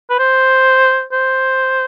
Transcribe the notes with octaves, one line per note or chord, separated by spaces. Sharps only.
B4
C5
C5